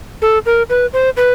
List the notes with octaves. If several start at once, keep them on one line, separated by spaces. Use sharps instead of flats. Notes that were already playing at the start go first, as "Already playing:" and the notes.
A4
A#4
B4
C5
B4